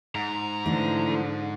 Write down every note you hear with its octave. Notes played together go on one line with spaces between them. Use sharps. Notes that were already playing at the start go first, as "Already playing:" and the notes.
G#2 A#5
D3 E3 F3 A3